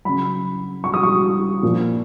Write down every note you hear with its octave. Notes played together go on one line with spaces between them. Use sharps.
C#3 F#3 B5
C#6
D#6
C#6
A#2 F3